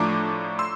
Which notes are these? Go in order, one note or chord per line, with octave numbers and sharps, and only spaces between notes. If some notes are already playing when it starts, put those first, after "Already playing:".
Already playing: A2 F3 A3 D4 A#5 D6
C6 E6